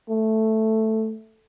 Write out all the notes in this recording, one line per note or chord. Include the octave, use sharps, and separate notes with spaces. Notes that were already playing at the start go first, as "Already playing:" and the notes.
A3